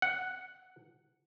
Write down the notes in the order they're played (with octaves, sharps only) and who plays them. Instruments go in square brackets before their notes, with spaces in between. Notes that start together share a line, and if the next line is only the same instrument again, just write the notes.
[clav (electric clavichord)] F#5